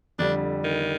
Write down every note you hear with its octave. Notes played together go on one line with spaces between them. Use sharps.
F2 D3 G3 D4
D#3